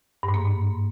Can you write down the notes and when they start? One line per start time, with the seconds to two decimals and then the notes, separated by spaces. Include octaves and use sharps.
0.23 G2
0.29 G#2
0.34 A#3